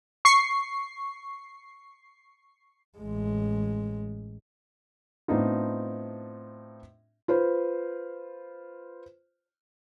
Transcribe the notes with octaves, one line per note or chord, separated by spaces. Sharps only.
C#6 C7
A1 G#3
A2 B3 C4 D4 D#4 F4
F4 B4 C5